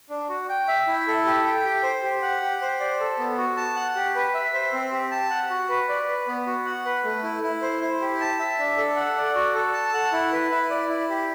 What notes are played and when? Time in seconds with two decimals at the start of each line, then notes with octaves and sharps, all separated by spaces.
0.10 D4
0.29 F#4
0.49 G5
0.68 E5
0.87 E4
1.07 A4
1.26 G4
1.45 G5
1.65 G4
1.83 C5
2.03 G4
2.22 F#5
2.42 G4
2.62 C5
2.80 D5
3.00 A4
3.19 B3
3.38 F#4
3.57 A5
3.76 F#5
3.96 G4
4.16 B4
4.34 E5
4.54 C5
4.73 C4
4.92 G4
5.11 A5
5.30 F#5
5.50 F#4
5.69 B4
5.89 D5
6.08 B4
6.28 B3
6.47 F#4
6.65 F#5
6.85 B4
7.04 A3
7.23 E4
7.43 E4
7.62 C5
7.82 E4
8.01 G4
8.20 A5
8.39 E5
8.59 D4
8.78 A4
8.96 F#5
9.17 D5
9.35 F#4
9.55 A4
9.73 A5
9.94 F#5
10.13 E4
10.32 B4
10.51 E4
10.70 D5
10.89 E4
11.10 G4